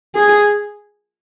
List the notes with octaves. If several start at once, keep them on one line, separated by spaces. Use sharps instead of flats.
G#4